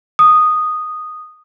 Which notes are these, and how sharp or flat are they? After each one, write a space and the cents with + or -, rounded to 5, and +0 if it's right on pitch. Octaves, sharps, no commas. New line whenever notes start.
D#6 -5